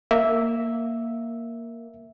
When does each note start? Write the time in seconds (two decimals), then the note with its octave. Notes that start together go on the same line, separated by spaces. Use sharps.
0.11 A#3 E5